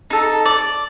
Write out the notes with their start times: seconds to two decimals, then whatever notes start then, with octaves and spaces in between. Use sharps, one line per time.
0.10 D#4 A4
0.45 D5